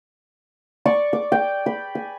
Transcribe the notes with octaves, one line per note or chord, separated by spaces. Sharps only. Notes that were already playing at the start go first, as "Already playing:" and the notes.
D5 C#6
D6
G5
B5
G#5